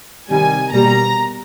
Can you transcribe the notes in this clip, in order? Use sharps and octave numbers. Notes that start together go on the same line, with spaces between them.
C3 D#3 G3 G#5
B2 G3 A#3 A#5